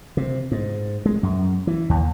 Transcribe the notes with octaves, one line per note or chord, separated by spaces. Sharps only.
C3
G#2
G#3
F#2
E3
D#2